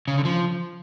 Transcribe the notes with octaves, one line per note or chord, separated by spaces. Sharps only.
C#3
D3
F3